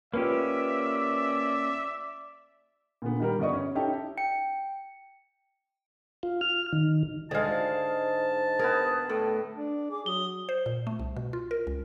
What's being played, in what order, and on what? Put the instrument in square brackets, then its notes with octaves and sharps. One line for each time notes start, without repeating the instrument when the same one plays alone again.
[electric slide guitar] A#3 C#4 G4 [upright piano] F4 B4 [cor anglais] D5 [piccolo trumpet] E5
[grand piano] A#2 D3 B3
D#3 G3 A#4
G1 B3 D5 D#5 C#6
C#4
C#4 D#4 E4 G4 A4
[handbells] G5 C#7
[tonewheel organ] F4
F6
D#3
[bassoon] D2 [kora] D3 G#3 [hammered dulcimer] G#4 F5 [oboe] A5
[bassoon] G#2
[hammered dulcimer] B3 G#4 [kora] A#4
[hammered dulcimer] A2 [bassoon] A4
[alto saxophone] D4
[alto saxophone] G#4 [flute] D6
[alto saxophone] F#3 [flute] D#6 [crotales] G7
[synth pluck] C5
A#2
A3
C2
B2
F4
A#4
C#2